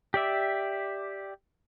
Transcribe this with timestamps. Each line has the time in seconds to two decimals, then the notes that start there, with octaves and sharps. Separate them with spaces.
0.14 G4 D5 E5